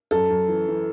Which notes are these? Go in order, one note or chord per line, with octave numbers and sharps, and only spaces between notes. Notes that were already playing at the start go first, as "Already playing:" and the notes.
F#2 A4
F#2
E3
E3